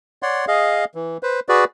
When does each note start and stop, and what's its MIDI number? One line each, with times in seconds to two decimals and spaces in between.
0.23 0.45 73
0.23 0.45 74
0.23 0.45 78
0.23 0.45 84
0.48 0.85 68
0.48 0.85 75
0.48 0.85 77
0.95 1.17 52
1.23 1.40 71
1.23 1.40 72
1.49 1.65 66
1.49 1.65 68
1.49 1.65 71
1.49 1.65 74